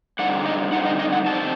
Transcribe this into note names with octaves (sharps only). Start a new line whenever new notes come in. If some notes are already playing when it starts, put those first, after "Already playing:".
D3 G3 C4 D#4 F#5
D#5
D3 G3 C4 D#4 F#5
D#5
D#5
F#5
D3 G3 C4 D#4 A5